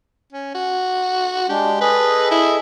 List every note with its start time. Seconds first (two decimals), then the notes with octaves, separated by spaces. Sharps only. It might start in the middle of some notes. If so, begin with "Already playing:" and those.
0.33 C#4
0.55 F#4
1.49 G#3 D4 G4
1.81 G#4 A4 B4 D#5
2.31 E4